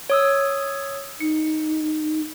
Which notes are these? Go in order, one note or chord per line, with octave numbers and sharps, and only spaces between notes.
C#5 D#6 E6
D#4 C#7